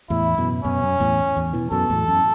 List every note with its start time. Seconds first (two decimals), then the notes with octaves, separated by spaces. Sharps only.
0.10 E2 A2 E4
0.38 F#2 B2
0.65 F#2 B2 C#4
0.83 F#2
1.00 E2 A2
1.37 E2
1.53 B2 E3
1.71 F#2 B2 A4
1.90 E2 A2
2.08 F#2